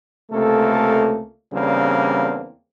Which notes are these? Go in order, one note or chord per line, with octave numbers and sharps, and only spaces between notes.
C#2 C3 A3 A#3 A4
E2 C#3 G3 A#3 C4 D4